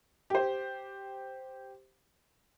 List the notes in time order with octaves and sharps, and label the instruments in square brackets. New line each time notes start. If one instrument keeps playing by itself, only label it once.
[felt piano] G4 C5